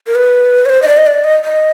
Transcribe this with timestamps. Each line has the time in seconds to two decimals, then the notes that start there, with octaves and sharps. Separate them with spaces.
0.07 A#4
0.15 B4
0.66 C#5
0.69 C5
0.82 D#5
0.88 D5
0.97 D#5
1.07 D5
1.24 D#5
1.45 D#5